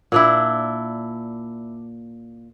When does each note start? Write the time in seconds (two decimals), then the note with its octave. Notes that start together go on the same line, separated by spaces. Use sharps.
0.12 A#2 D4 E4